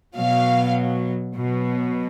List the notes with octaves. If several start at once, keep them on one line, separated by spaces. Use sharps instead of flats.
B2 F#3 F5
B2 F#3